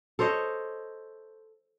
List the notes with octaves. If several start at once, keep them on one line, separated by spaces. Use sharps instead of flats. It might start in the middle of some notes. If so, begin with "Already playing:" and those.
A4 C5 C#5 D#5